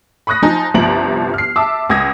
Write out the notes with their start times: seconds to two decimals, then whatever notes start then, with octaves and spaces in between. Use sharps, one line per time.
0.27 B5 C#6 D#6 F#6 A#6
0.42 F3 D#4 G#5 G6
0.74 G1 C2 F3 A#5 D7 F#7
1.34 F6 C7
1.56 E5 A5 D6 E6
1.90 C#2 D#6 E6 G#6 A#6